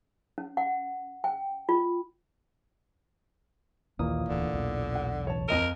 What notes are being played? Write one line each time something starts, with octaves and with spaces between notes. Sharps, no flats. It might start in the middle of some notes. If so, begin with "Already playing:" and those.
C#4
F#5
G5
F4
A#1 D#2 A#2 E3 A#3 D#6
D1 E2 D3
B1 E2
F#5
A1 C#5 A5
F2 A#4 D#5 D#7